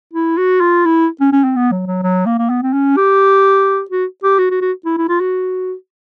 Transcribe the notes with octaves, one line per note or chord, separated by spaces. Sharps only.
E4
F#4
F4
E4
C#4
C#4
C4
B3
F#3
F#3
F#3
A#3
A#3
B3
C4
C#4
G4
F#4
G4
F#4
F#4
F#4
E4
E4
F4
F#4